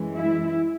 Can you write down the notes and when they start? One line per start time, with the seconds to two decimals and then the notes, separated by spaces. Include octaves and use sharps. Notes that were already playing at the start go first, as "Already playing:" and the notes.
Already playing: F#2 E3 G#3
0.15 E4